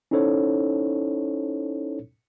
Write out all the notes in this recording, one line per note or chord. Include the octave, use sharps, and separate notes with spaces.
C#4 D#4 E4 A4 C5 C#5